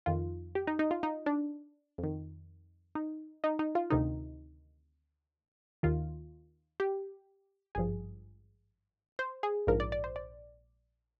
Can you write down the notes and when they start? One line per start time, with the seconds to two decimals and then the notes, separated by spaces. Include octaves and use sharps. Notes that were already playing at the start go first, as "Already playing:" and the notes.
0.06 F2 D#3 F4
0.55 G4
0.67 D#4
0.79 D#4
0.91 F4
1.03 D#4
1.26 D4
1.98 F2
2.04 D#3
2.95 D#4
3.44 D#4
3.59 D#4
3.75 F4
3.90 D2 C3 D#3 D#4
5.83 D#2 D#3 F4
6.80 G4
7.75 G#1 G2 F3 G#4
9.19 C5
9.43 G#4
9.67 A#1 G#2 F3 A#4
9.80 D5
9.92 D5
10.04 C5
10.16 D5